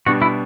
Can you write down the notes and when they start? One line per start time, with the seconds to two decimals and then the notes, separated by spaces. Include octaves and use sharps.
0.06 B2 G3 D4 F#4
0.22 E4